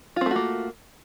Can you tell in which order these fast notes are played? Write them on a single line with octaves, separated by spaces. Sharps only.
F4 C4 A3 F#4 A#3